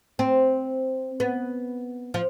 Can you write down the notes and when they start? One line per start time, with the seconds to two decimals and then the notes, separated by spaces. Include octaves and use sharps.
0.19 C4
1.20 B3
2.14 F3